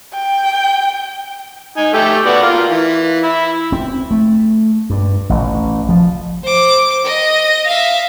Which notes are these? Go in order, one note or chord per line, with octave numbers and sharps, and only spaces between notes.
G5
D#4 G#5
A3 G4 A4
B3 F#4 D5
F4 A#4
E3
E4
C4
A3
G2
A1
F3
C5 D6
D#5
E5 F5